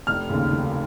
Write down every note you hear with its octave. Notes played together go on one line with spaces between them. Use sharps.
F1 F6
D#2 C#3
F1